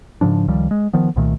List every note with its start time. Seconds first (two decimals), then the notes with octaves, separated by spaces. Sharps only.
0.21 G#2 C#3 F3 D4
0.48 C#2 D#3 F3 G3
0.71 G#3
0.93 D#3 F3 B3
1.16 C2 A#2 D#3 A3